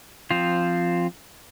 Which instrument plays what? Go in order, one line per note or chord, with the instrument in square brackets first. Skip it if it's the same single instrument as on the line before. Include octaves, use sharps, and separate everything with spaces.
[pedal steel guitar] F3 C4 F4